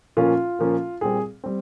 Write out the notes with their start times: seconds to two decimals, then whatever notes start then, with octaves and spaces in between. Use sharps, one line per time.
0.17 A#2 F3 A#3 C#4 F4
0.59 A#2 F3 A#3 C#4
1.01 A#2 G3 C4 G#4
1.44 G3 C4